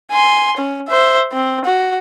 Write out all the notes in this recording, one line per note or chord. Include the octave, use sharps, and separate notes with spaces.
G#5 C6
C#4
C5 E5
C4
F#4